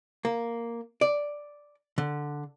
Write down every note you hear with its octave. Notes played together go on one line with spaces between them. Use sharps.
A#3
D5
D3